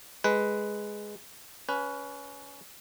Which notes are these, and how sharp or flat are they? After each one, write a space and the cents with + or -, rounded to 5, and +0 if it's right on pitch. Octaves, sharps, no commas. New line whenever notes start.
G#3 +0 B4 +0
C#4 +20 B4 -5